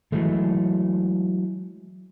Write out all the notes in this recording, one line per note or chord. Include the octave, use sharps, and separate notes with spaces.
E3 F#3 G#3 A3